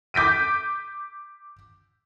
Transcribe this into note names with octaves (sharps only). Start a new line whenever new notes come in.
D6 G6 B6 D7 D#7